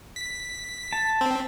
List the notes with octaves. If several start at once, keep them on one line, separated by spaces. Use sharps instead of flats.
B6
A5
C4